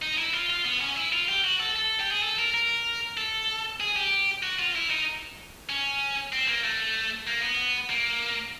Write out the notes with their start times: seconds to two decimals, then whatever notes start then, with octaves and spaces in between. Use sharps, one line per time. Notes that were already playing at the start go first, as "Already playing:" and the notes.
0.02 D#4
0.18 E4
0.34 F4
0.50 F4
0.65 B3
0.81 C#4
0.97 E4
1.12 F4
1.28 G4
1.44 F#4
1.60 A4
1.76 A4
2.00 G4
2.11 G#4
2.23 A4
2.38 A#4
2.54 A#4
3.17 A4
3.80 G#4
3.96 G4
4.43 F#4
4.59 F4
4.75 E4
4.90 D#4
5.69 C#4
6.33 C4
6.48 A#3
6.64 A3
7.27 A#3
7.42 B3
7.90 A#3